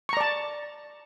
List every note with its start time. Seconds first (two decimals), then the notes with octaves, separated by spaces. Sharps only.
0.09 C#6
0.13 A#5
0.17 D5
0.21 A5